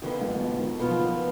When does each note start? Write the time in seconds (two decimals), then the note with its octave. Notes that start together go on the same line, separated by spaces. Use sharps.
0.02 F2 D3 D#3 F3 B3
0.21 G#2
0.35 G#2
0.40 B2
0.59 D#3
0.79 B2 B3 F4
0.88 F3
0.98 D#3
1.06 F3